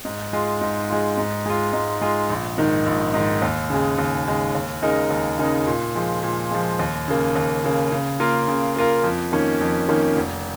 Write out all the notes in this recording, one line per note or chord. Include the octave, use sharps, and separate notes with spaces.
G#2
G#3 F4
G#2
G#3 F4
G#2
G#3 F4
G#2
G#3 F4
A#1
G#2 D#3
A#1
G#2 D#3
D#2
C#3 G#3
D#2
C#3 G#3
D#2
C#3 G#3 D#4 A#4
D#2
C#3 G#3 D#4 A#4
A#2
F3 G#3
A#2
F3 G#3
D#2
C#3 A#3
D#2
C#3 A#3
C#3
A#3 F4 A#4
C#3
A#3 F4 A#4
F2
D#3 A#3 C#4
F2
D#3 A#3 C#4
F1